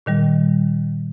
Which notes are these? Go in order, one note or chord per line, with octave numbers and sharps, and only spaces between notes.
A#2 D#3 G3